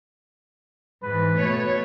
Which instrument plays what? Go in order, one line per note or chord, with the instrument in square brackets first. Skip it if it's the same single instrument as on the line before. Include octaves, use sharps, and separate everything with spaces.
[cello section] G#2 E3 [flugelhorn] B4
[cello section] B2 A3 C#5